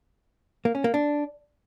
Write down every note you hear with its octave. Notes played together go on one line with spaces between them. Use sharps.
A#3
C#4
A#3
D4